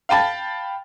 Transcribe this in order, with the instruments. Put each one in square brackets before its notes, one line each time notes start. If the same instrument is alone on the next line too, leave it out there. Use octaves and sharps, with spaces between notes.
[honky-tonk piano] F5 G5 A5 B5 A6